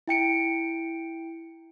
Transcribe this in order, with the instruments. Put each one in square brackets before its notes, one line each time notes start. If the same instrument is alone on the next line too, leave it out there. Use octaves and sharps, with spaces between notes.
[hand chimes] E4 G5 C#7 D7